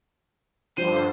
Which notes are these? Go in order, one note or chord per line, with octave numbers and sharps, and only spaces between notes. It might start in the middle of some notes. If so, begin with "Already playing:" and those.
G2 D3 F3 C5 D#7